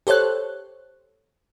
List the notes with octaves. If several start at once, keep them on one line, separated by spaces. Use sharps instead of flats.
G4 A4 C5 C#5 F#6